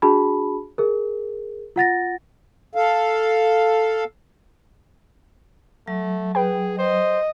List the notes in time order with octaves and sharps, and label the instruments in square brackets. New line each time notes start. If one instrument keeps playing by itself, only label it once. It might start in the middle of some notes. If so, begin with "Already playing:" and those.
[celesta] D4 F#4 G#4 A5 B5
G#4 A#4
F4 F#5 A6 A#6
[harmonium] A4 F5
[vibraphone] F#3 [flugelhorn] A3
[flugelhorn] G#4 [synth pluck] B4 G5
[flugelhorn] C5 [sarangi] D#5